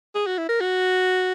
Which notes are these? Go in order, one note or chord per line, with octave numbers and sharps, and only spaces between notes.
G#4
F#4
E4
A#4
F#4